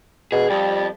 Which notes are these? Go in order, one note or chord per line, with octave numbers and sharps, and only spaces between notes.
B2 G#4
F2 G3